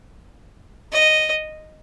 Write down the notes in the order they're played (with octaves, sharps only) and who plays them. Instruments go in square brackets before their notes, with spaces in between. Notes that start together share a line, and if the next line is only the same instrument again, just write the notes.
[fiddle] D#5